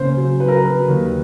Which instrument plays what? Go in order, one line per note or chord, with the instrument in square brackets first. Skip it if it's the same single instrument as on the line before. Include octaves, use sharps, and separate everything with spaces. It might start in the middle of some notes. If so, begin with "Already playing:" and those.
Already playing: [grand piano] C#3 A#3 C5
F#3
F#3 B4
A#4
B4
F#3
D#2